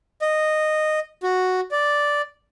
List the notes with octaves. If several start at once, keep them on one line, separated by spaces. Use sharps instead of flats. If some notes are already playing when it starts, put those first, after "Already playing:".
D#5
F#4
D5